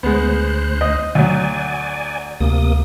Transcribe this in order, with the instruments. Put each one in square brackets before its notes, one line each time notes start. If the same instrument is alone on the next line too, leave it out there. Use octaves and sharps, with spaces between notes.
[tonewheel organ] D2 C5 F#6 [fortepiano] G#3 B3
[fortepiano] D#5
[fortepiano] D2 F#3 [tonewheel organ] D5 G#5
[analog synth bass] D2 [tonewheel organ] C3 A#3 D#6